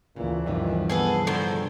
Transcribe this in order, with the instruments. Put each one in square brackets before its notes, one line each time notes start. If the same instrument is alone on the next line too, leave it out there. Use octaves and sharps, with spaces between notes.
[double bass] D2 E3 [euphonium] A#2 [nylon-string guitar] C#3
[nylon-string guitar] G2 C3 F3 [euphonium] D#3
[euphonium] B3 [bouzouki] G#4 A4 B4
[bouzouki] A2 D#3 C5 [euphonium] D3